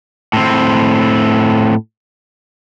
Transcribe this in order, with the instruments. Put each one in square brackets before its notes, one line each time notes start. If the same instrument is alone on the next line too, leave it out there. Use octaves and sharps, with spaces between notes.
[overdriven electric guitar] A2 C4